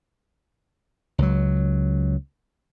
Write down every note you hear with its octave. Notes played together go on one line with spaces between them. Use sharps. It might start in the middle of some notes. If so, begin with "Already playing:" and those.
C#2 F#3